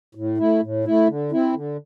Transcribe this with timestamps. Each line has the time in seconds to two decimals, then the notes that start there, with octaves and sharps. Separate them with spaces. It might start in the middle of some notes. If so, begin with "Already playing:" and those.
0.15 A2
0.38 A3 E4
0.62 A2
0.85 A3 E4
1.08 D3
1.31 C4 E4
1.54 D3